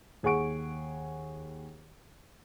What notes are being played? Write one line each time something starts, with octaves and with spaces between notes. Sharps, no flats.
D#2 G#4 F#5 C#6 D7